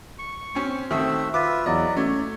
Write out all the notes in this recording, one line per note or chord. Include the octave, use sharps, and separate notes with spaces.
C#6
C4 C#4
D#3 A3 C4 F#4 E5
F4 B4 E5 D6
E2 F#3 D5 D#5
A3 C#4 C#5